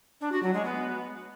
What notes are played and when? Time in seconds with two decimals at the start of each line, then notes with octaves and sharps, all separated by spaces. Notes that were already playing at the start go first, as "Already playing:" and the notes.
0.21 D4
0.32 F#4
0.43 F#3
0.54 G#3
0.65 B3